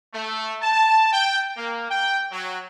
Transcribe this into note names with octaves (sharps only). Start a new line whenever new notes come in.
A3
A5
G5
A#3
G5
F#3